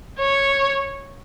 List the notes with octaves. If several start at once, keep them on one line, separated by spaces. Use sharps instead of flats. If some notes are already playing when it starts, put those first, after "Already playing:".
C#5